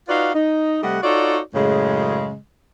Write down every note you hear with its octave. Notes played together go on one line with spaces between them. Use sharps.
D#4 F4 F#4 B4 D5 F5
D#4
C3 G3 A3 D#5 F#5
D#4 F4 F#4 A4 C#5 D5
F#2 A2 C#3 G#3